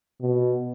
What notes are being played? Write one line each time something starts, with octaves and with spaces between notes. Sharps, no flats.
B2